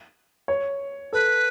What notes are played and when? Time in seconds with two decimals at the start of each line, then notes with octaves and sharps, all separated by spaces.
0.48 C#5
1.13 A4 B4